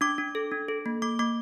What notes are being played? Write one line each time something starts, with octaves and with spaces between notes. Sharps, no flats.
D4 D6
D4
A4
D4
A4
A#3
A#3 D6
A#3 D6